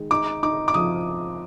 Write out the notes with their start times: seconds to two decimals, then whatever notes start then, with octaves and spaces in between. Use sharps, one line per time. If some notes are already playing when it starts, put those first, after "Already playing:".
Already playing: D#3 G#3
0.11 D#4 D6
0.43 D#4 D6
0.68 D6
0.74 F3 D#6